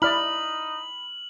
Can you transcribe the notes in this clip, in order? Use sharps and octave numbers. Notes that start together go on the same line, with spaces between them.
D#4 E4 D5 B5 F6 F#7